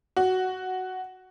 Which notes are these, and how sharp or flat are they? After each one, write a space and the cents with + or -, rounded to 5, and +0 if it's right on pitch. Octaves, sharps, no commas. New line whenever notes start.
F#4 +5